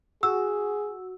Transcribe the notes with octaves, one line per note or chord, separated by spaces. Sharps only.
F#4 G#4 E6